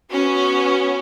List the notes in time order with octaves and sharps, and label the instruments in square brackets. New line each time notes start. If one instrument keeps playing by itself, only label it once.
[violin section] B3 C#4 [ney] F#4